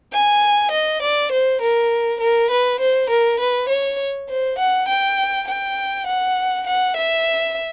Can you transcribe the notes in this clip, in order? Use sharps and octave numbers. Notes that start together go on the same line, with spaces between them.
G#5
D#5
D5
C5
A#4
A#4
B4
C5
A#4
B4
C#5
C5
F#5
G5
G5
F#5
F#5
E5